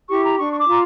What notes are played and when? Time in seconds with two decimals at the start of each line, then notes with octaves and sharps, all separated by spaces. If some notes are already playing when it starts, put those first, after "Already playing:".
0.08 E4 G4 C#6
0.24 A#5
0.39 D4 C#6
0.52 C#6
0.58 D6
0.68 F4 A#5